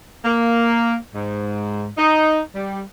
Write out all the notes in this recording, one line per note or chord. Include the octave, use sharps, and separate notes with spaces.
A#3
G#2
D#4
G3